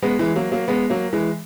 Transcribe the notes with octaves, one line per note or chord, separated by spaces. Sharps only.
G#3 B3
E3 G#3
F#3 A#3
F#3 A#3
G#3 B3
F#3 A#3
E3 G#3